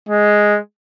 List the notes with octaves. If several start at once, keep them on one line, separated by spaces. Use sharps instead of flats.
G#3